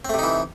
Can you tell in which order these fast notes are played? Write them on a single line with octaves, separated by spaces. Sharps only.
C4 A3 C3 D#4 E3